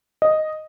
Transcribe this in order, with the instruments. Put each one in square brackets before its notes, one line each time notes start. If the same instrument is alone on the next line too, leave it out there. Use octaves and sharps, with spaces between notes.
[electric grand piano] D#5